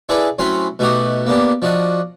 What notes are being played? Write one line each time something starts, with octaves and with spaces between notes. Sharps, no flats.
D4 E4 G#4 A4 B4
A2 F#3 C4 C#4 B5 C6
B2 A3 D#4 F#4 G4 F#5
A#3 B3 D4 G4
F3 D4 F#4 D#5